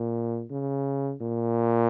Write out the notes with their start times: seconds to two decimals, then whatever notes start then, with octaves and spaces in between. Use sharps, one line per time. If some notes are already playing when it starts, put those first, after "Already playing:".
Already playing: A#2
0.51 C#3
1.21 A#2